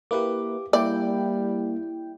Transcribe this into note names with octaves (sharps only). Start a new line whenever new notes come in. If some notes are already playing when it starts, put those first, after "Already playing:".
A#3 E4 G4 B4 D6
G3 A#3 E4 D5 G5